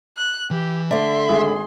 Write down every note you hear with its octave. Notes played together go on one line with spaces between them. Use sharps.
F#6
E3 G4
D3 A3 D5 E5 C6
G#1 G#4